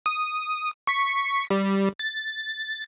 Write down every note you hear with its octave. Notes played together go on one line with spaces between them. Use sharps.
D#6
C#6 B6
G3
A6